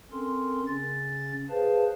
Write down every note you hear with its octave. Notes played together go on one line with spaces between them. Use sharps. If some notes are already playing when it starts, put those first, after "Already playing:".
C4 C#4 A4 A#4 C6
C#3 C#4 A6
G#4 B4 C5 F5 A5